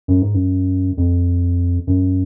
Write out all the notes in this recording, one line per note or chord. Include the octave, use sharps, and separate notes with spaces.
F#2
G#2
F#2
F2
F#2